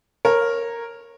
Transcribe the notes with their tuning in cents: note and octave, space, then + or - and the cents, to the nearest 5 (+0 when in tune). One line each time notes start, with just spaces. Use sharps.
A#4 +0 C#5 -20